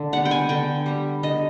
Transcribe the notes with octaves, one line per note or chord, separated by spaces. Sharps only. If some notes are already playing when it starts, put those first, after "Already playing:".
Already playing: D3
G3 B3 F#5
G5
G#5
D3 G5
G3 B3
D3 D#5